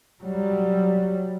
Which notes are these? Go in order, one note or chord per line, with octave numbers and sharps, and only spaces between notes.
F#3 G3